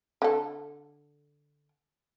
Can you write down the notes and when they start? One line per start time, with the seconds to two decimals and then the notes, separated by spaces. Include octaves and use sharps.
0.22 D3 A4